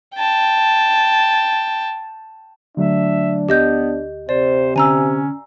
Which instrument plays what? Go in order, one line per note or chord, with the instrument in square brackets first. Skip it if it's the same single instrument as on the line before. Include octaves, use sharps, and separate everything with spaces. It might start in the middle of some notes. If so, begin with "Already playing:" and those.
[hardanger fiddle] G5 A5
[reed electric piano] D3 F#3 A3 [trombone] D4 [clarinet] E5
[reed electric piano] D2 [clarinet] B3 [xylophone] G4 D#5 G6
[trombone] C3 [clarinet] C5 [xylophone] D5
[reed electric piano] D3 [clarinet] C#4 [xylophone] G#5 A#5 E6